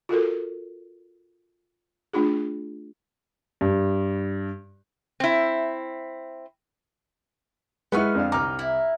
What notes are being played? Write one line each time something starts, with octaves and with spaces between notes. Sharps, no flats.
F4 F#4 A4 A#4
A3 D4 F4 G#4
G2
C4 E4
G#3 B3 D#4 E4 B4 F#5 C#6 F6
F2 D4 F5
C2 D#4 A#5 D6 F6
E4